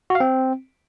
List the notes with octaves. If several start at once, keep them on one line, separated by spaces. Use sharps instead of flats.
F#4
F5
C4